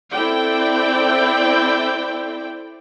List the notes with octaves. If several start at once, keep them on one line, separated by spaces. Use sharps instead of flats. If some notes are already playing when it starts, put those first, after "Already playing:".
C4 E4 A4 D5 G5